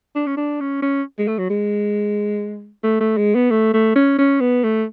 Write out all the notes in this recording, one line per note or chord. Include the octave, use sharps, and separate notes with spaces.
D4
C#4
D4
C#4
C#4
G#3
A3
F#3
G#3
A3
A3
G#3
B3
A3
A3
C#4
C#4
B3
A3